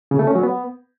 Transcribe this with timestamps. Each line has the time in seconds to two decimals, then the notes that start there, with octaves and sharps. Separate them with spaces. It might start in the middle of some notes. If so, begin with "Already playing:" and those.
0.11 C#3
0.19 A3
0.27 C#4
0.35 F#3
0.43 B3